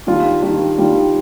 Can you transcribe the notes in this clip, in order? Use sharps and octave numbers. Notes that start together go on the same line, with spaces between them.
D#3 G3 D4 F4
D#3 G3 D4 F4
D#3 G3 D4 F4